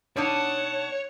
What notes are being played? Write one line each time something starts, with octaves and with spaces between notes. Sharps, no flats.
B2 D4 D#4 C#5 F#5 A5